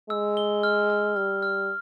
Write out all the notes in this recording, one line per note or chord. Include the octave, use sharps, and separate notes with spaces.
G#3 E6
G7
F6
F6
G3 F6
F6